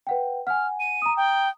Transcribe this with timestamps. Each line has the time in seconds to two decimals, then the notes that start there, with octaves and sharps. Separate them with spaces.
0.07 B4 F#5 G5
0.47 F#5 G#5 F6
0.80 D#7
1.02 A#5 D#6
1.17 G5